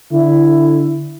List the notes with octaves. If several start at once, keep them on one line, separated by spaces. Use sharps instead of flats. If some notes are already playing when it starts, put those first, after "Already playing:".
D3 E4